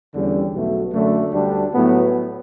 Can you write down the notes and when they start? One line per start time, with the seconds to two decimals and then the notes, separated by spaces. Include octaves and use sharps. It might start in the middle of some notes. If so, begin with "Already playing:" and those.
0.13 E2 D3 G3 C#4
0.53 B1 B2 A3
0.93 F#2 D3 A3
1.33 D2 D3 G3 D4
1.73 A2 F#3 B3